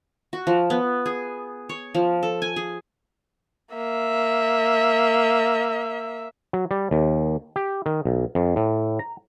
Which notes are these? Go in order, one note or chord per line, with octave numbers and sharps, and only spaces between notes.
F#4
F3
B3
G#4
C#5
F3
A4
G#5
G#4
A#3 E5
F#3
G3
D#2
G4
D#3
B1
F2
A2
A#5